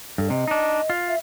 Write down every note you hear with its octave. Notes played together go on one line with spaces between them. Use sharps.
G2 A4
C3 D#5
D4 D#4
F4
E5